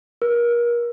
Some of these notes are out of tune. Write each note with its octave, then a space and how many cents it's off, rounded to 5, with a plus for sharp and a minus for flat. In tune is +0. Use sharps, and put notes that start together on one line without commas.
A#4 +35